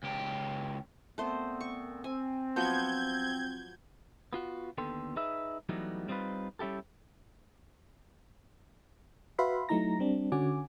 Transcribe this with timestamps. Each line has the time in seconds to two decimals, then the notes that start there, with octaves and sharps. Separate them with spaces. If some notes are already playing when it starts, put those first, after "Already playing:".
0.03 C#2 G4
1.18 A#2 A3 B3 C4 C5
1.60 C#6
2.04 C4 G#5
2.56 F3 F#3 B3 G6 G#6
4.33 B3 F4 F#4
4.78 D#2 D3 B3 A4 G5 C6
5.16 D#4 G#4 B4 E5
5.69 E3 F#3 G3 A3 B3 D#4
6.08 G3 C4 D#4 F4 B4
6.59 G3 C#4 E4 G4 A4
9.39 F#4 B4 E5 F5 B5 C6
9.69 F#3 A3 D#4 E4 A#5 A#6
9.99 G3 C4 D4
10.32 D3 C#4 F#4 G#5 D6